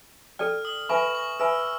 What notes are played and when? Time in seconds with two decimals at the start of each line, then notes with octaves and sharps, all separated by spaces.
0.39 A4 D5 G5 F6
0.65 D#6
0.89 B4 E5 G#5 B5 C#6
1.15 C#6
1.39 B4 E5 G#5 B5 E6